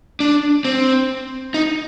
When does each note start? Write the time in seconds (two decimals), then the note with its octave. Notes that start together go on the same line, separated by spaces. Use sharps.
0.20 D4
0.65 C4
1.54 D#4